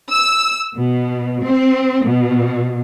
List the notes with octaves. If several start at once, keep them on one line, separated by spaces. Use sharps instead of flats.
E6
B2
C4
B2